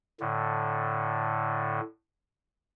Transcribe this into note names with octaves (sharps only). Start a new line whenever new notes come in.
A2 D3